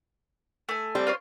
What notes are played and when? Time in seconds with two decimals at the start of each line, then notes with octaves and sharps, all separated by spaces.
0.69 A3 G#5
0.95 G3 C4
1.07 F4 C5 C#5